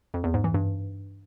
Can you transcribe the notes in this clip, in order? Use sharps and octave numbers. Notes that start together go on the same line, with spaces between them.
F2
E2
G#2
E3
G2